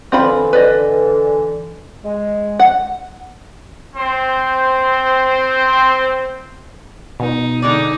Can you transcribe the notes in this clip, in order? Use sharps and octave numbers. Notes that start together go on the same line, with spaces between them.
D3 E3 C4 F4 B5
B4 D5 D#5
G#3
F#5
C4 C5
B2 D#4
D3 G#3 D#4 D5